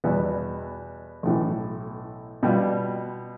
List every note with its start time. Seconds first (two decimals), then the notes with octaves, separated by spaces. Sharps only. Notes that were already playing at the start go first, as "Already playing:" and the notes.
0.04 E2 B2 G3 B3
1.23 B1 A2 E3
2.43 B2 G3 B3 F4